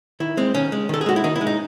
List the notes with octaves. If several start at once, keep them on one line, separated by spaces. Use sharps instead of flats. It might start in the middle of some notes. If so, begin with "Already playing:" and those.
D#3 E4
G#3 C4
D#3 C#4
G#3
D#3 A4
G#4
G#3 F#4
E4
D#3 D#4
E4
G#3
D#4